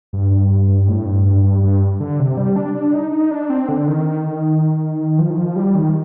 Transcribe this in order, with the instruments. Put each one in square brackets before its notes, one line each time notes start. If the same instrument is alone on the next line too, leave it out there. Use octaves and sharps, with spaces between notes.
[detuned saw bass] G2
G2
G2
G2
A2
G2
G2
G2
G2
D3
C3
G3
D4
D4
D#4
D#4
D4
C4
D3
D#3
F3
D#3
F3
G3
D#3